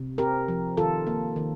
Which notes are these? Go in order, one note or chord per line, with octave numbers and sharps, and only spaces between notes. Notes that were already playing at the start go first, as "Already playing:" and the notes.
Already playing: C3
C4 G4 A#4
F3
D#3 F4 A4
A#3
D#3